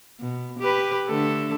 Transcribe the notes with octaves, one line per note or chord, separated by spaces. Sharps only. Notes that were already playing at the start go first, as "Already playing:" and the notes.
B2
G4 B4
D3 A3 A4